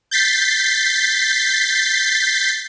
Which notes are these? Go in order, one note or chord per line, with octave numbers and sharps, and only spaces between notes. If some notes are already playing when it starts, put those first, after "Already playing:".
G6 A6 B6 C7